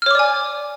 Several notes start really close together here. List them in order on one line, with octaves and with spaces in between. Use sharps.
F6 C#5 D6 D5 G#5